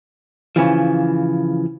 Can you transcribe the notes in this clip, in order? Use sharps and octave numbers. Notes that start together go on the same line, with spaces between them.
C#3 E3 F3